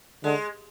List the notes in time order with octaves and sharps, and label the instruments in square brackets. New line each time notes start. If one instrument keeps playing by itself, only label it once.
[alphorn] D3 [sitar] G#3